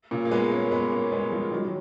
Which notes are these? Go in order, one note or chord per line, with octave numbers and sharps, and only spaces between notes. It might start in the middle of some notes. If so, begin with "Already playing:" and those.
A#2 C#3
A#3
G#3 B3
A#3 C#4
A#3
G#3 B3
A#3 C#4
G#3 B3
F3 G#3
D#3 F#3
F#3